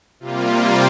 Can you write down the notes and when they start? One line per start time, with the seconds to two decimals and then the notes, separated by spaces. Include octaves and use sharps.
0.20 C3 G3 A#3 F4